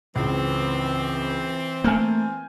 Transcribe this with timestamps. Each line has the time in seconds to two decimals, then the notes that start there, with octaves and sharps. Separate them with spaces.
0.16 G#1 C#2 E3 C4
1.84 A3 A#3 G#5 F6 G6